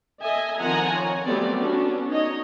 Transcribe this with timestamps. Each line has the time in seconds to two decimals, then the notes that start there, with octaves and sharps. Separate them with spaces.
0.21 A4 D#5 E5 G#5
0.59 D#3 F3 C4 F#5 G#5 A#5
0.96 C#5
1.24 F#3 G3 A3 B3 C4 D5
1.58 B3 C#4 D4 F#4 A4
2.08 D#4 C#5 D#5